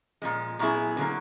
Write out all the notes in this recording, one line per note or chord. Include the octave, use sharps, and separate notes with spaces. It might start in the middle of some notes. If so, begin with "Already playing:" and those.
A#2 F3 G#3
A#2 F#3 B3 E4 G#4
D3 F#3 A#3